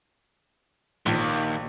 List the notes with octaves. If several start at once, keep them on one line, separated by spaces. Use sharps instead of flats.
A#1 D#2